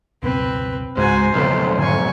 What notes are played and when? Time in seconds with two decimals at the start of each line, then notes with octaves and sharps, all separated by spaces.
0.23 C#2 F#2 B2 C4 B4
0.97 C#2 G#2 F#4 C5 G#5
1.34 B1 F2 C#3 A4 B4
1.79 G#2 D3 D#3 G#5 C#6